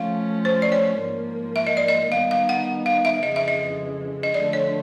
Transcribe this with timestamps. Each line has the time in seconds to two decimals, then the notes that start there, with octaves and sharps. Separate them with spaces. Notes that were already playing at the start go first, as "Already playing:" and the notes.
Already playing: F3 A3 C#4 F5
0.45 C5
0.62 D5
0.72 C#5
1.00 G#2 F3 A#3
1.56 E5
1.67 D#5
1.77 D5
1.88 D#5
2.11 D#3 G3 B3 D#4 F5
2.31 F5
2.49 F#5
2.86 F5
3.05 E5
3.23 F2 C#3 E3 G#3 D#5
3.36 E5
3.48 D#5
4.23 D#5
4.34 D3 F3 A3 D5
4.53 C#5